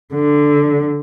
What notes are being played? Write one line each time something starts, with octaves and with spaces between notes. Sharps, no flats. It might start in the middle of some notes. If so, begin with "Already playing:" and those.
D3